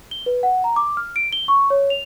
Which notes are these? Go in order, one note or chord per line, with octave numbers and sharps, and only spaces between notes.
G7
B4
F#5
A#5
D6
F6
D7
G7
C#6
C#5
F7